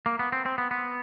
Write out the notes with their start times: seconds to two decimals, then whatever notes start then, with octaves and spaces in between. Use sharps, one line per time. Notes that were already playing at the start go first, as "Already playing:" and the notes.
0.06 A#3
0.19 B3
0.32 C4
0.46 C4
0.58 B3
0.71 B3